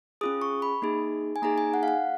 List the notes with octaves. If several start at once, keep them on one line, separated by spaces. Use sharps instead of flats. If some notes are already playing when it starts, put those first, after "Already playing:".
C#4 F4 G#4 D#6
C#6
B5
A#3 D#4 G#4
G#5
A#3 D#4 G#4 A#5
G#5
F#5
F5
F#5